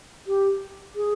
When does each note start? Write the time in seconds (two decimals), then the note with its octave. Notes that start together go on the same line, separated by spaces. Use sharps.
0.27 G4
0.96 G#4